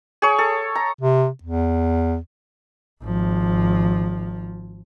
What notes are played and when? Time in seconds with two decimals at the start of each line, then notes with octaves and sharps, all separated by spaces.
0.22 G#4 C#5
0.38 A4
0.75 A#5
1.01 C3
1.43 E2
3.03 G#1 F3